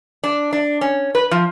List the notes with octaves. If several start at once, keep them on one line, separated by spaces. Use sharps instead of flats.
D4
D4
C#4
B4
F3